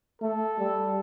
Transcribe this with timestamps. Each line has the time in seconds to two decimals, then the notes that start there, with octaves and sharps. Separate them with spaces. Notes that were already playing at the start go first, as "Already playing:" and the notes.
0.22 A3 A4
0.59 G3